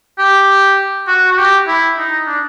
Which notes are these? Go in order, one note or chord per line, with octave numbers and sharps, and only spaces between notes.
G4
F#4
F#4
G4
E4
D#4
D4